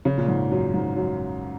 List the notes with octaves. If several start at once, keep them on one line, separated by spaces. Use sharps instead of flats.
C#3
A#2
G#2
F#2
G#2
F#2